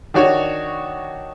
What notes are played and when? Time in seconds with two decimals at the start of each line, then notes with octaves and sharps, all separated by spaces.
0.14 D#3 D4 F#4 C#5